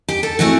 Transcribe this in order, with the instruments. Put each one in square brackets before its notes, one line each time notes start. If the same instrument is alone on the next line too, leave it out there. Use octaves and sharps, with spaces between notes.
[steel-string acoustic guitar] G4
A4
E3 A3 C4 F#4